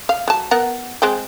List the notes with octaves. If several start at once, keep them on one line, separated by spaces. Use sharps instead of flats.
F5
F#3 A5
B3 A#4 F#5
G#3 C4 G5